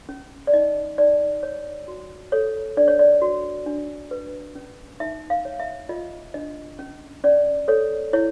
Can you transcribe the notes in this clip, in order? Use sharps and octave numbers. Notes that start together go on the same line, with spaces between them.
C#4
D5
D#4 D#5
D#4 D5
C#5
F#4
A4 C#5
D4 D5
C#5
D5
F#4
D4
B4
C#4
D#4 E5
F5
C#5
E5
F4 D#5
D4 D#5
C#4
C#4 D5
A4 C#5
E4 C#5